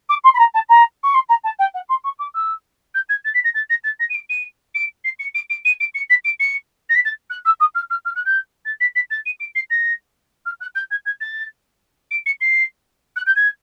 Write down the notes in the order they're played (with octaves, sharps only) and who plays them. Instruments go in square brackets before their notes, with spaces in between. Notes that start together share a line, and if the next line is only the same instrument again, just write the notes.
[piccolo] D6
C6
B5
A#5
A5
A#5
C#6
C6
A#5
A5
G5
F#5
C6
C#6
D6
E6
G6
G#6
A6
B6
A#6
A6
A#6
A6
A#6
D#7
D7
D#7
D7
C7
C#7
D7
D7
D#7
D7
C#7
B6
D7
C#7
A#6
B6
A6
F#6
E6
D#6
F6
F6
F6
F#6
G6
A6
B6
B6
A6
D#7
D7
C7
A#6
F6
F#6
G6
G#6
G#6
A6
D7
C#7
C7
F#6
G6
G#6